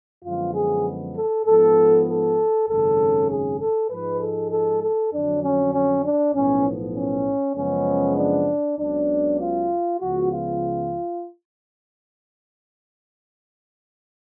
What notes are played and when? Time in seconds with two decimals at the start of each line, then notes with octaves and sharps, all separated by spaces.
0.24 F#2 D3 F3 G#3 B3 F4
0.55 G#4
1.16 A4
1.46 G#2 F3 B3 A4
2.08 A4
2.69 G#1 F#2 C#3 A4
3.30 G#4
3.60 A4
3.90 G#2 F3 G#3 B4
4.21 A4
4.52 A4
4.82 A4
5.13 F2 D3 F#3 D4
5.43 C#4
5.73 C#4
6.04 D4
6.35 B1 A2 F3 B3 C#4
6.96 C#4
7.56 F#2 C#3 F3 G#3 B3 C#4
8.17 D4
8.78 C#2 C#3 F#3 B3 D4
9.39 F4
10.00 C#2 C#3 F3 B3 F#4
10.31 F4